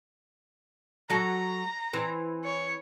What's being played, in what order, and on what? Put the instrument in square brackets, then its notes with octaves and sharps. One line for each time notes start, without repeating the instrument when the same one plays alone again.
[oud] F#3 F#4 A4 [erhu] A#5
[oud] E3 C4
[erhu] C#5